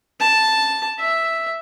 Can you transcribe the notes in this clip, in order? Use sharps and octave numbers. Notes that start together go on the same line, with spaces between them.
A5
E5